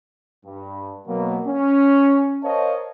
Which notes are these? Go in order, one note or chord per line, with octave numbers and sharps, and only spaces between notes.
G2
B2 F#3 A#3
C#4
A#4 C5 C#5 D#5 F5 A5